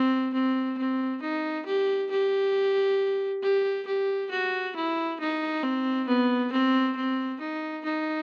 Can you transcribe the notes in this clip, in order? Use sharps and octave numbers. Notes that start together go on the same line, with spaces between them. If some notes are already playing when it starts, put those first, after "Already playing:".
Already playing: C4
C4
C4
D#4
G4
G4
G4
G4
F#4
E4
D#4
C4
B3
C4
C4
D#4
D#4